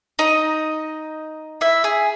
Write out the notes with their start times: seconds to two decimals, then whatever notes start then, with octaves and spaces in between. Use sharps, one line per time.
0.19 D#4 D#5
1.61 E4 E5
1.84 G#4